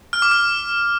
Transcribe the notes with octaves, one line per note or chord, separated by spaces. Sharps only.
F6
D6
F6